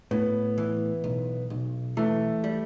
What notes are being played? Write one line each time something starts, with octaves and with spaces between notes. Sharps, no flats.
A2 B3
E3
B1
B1
E3 A3
G3